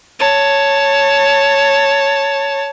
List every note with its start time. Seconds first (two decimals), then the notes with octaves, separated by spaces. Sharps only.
0.19 C#5 A5